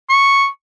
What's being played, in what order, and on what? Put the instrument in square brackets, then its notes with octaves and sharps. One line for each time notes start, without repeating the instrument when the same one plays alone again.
[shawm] C#6